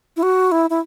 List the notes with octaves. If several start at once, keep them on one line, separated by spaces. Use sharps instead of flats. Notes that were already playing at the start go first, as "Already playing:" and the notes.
E4
F#4
E4
E4